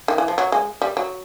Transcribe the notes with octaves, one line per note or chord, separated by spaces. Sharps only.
D#3
E3
F3
F#3
G#3
G3
F#3